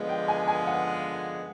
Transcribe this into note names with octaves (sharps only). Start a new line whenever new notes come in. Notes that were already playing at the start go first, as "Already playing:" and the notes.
Already playing: D3 F3 G#3 B3
G5
G#5
G#5
F#5